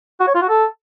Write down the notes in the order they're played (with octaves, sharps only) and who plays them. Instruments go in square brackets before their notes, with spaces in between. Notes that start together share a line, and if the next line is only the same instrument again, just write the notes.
[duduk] F#4
C#5
F4
F#4
A4